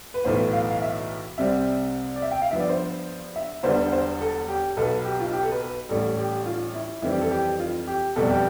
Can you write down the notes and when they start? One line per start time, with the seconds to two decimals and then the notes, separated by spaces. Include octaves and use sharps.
0.14 B4
0.24 B1 A2 E3 B3 C5
0.53 F5
0.71 F5
0.82 E5
1.38 C2 C3 G3 C4 E5
2.16 D5
2.22 E5
2.31 G5
2.42 F5
2.51 G2 F3 B3 E5
2.60 D5
2.69 C5
3.36 E5
3.63 E1 E2 D3 G3 B3 C5
3.92 C5
4.21 A4
4.48 G4
4.77 B1 B2 B3 A4
5.05 G4
5.20 F4
5.33 G4
5.43 A4
5.51 B4
5.62 B4
5.89 A1 A2 G3 A4
6.17 G4
6.46 F4
6.74 E4
7.02 F2 E3 G3 C4 E4
7.13 G4
7.22 A4
7.31 G4
7.59 F4
7.87 G4
8.16 F1 E2 B2 G3 A4
8.30 G4